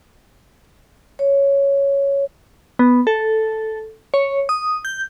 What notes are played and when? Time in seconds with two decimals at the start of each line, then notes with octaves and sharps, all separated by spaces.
1.19 C#5
2.79 B3
3.07 A4
4.14 C#5
4.49 D#6
4.85 G6